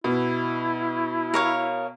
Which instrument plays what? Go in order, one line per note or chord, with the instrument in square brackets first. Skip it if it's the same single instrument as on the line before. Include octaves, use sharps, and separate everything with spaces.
[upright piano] B2 [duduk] E4
[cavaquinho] A#4 C#5 F5